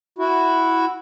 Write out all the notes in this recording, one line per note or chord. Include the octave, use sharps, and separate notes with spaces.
E4 F#4